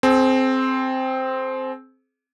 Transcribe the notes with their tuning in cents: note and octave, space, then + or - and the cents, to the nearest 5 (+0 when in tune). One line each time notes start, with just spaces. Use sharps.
C4 +0 G#4 +40